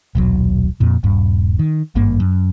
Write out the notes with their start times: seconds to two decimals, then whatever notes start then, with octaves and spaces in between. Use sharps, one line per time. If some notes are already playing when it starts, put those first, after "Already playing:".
0.15 D#1 B1 F#3
0.80 F2 A#2
1.03 D#1 G2
1.59 D#3
1.95 G#1 G2 A#3
2.20 F#2